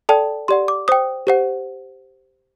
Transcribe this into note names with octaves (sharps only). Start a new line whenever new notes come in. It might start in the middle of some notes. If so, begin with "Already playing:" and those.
A4 D5 G5 A5
G4 D5 F#5 C6
D6
C5 G5 D#6
G4 C5 F#5